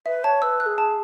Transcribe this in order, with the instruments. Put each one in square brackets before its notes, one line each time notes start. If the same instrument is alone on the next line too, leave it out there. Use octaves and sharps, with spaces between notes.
[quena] B4 [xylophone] E5
[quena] C#5 [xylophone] A5
[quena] B4 [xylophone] E6
[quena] B4 [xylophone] F#6
[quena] G#4
[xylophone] A5